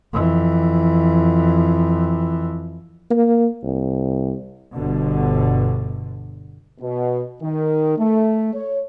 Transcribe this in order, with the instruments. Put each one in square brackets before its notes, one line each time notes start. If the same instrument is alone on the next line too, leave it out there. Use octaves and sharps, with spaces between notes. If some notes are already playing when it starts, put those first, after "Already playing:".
[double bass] F2 E3
[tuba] A#3
C2
[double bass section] G1 B2 D3
[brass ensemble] B2
D#3
A3
C#5